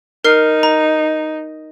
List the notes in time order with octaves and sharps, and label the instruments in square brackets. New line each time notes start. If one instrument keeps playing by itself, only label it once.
[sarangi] D#4 [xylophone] A#4 F6 C7
[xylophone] A#5